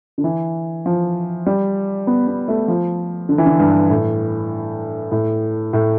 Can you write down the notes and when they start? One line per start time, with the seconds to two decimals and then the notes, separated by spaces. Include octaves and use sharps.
0.18 D3
0.24 E3
0.86 F3
1.46 G3
2.07 B3
2.28 B3
2.48 A3
2.68 F3
3.29 D3
3.38 E3
3.46 D3
3.59 G2
3.90 A2
5.12 A2
5.73 A2